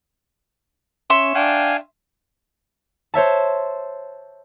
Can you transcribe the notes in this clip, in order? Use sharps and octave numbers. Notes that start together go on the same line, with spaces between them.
C#4 E5 C6 C#6
D4 F5 G5 G#5
C5 C#5 E5 A5